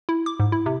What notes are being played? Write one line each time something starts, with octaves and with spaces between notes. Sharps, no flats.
E4
D6
G#2
E4
C3